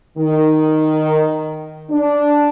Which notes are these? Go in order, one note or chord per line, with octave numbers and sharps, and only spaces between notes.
D#3
D4